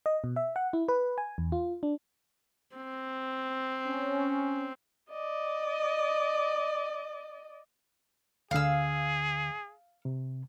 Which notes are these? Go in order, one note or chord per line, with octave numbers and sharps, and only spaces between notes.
D#5
B2
E5
F#5
E4
B4
G#5
E2
F4
D4
C4
C#4
D5 D#5
D2 D3 G#4 F5 E6
C3